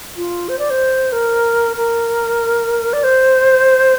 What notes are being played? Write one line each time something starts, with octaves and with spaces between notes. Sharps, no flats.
F4
C5
D5
C5
A#4
A#4
D5
C5